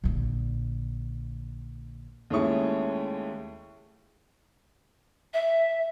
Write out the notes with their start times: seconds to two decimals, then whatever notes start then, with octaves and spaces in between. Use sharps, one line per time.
0.04 A#1 D3
2.30 D#2 G#3 A3 C#4 E4 C#6
5.33 E5